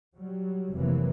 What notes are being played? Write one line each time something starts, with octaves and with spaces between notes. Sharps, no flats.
F#3 G3
F1 C3 E3 F#3 A#3